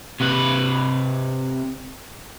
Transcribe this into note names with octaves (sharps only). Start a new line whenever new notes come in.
C3 B4